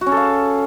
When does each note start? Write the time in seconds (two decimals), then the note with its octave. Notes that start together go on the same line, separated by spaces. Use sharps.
0.01 F#4
0.06 C#4
0.12 A4
0.17 F5